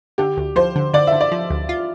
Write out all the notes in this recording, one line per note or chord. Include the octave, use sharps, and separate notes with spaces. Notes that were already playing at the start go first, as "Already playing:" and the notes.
D3 G4
D2
F3 C5
D3
D3 D5
E5
D3
D5
F3
D2
F4